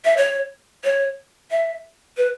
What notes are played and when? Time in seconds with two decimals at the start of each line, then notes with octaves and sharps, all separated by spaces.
0.05 E5
0.17 C#5
0.84 C#5
1.51 E5
2.17 B4